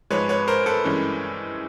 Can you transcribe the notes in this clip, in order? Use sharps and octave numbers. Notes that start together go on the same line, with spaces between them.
G#2 F3 G#3 B4 C#5
B4 C#5
A#4 C5
A4 B4
G2 E3 G#3 C#4